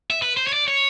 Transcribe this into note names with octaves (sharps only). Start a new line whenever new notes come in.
E5
B4
C5
C#5
D5
C#5